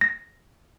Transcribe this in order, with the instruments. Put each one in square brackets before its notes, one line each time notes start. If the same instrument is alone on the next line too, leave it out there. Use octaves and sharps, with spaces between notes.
[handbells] A#6